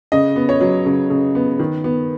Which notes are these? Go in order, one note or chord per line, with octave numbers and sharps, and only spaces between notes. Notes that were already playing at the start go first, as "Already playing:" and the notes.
C#3 D#5
B3
C#5
F#3
C#3
C#3
B3
D#3
B3